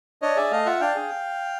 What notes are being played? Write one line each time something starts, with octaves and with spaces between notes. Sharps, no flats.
D4 C#5 D#5
G#4 D5 E5
A3 D#5 F5
F4 E5 F#5
D4 F5 G5
G#4